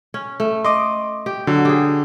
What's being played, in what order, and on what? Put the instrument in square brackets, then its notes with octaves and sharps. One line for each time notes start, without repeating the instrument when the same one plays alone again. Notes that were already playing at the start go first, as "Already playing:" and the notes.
[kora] C#4
A3
[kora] D#5 [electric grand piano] C6 D6
[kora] G4
[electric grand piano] D3 [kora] F#3
[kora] G4 G#4